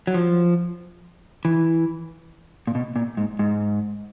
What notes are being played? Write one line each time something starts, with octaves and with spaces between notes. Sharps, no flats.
F#3
F3
E3
A#2
B2
A#2
G#2
G#2